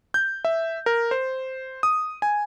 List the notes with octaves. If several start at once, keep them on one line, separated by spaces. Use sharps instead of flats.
G6
E5
A#4
C5
D#6
G#5